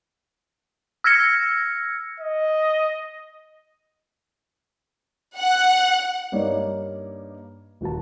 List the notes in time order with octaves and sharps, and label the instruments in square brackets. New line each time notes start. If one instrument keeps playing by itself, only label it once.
[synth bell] E6 F6 G#6 A#6 C#7
[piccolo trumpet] D#5
[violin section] F#5
[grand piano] G2 G3 A#3 D#4 C#5 D5
D#1 F#4 A5